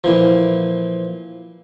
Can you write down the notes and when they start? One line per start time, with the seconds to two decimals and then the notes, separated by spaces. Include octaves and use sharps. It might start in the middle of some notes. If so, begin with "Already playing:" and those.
0.04 A#2 E3 F3